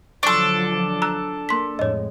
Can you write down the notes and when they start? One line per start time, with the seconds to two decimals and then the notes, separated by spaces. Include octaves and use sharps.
0.23 D3 F3 F#3 D4 A4 C6 C#6
1.02 A#5 E6 F#6
1.49 A#3 C6 B6
1.79 F2 A2 G#3 C#5 D#5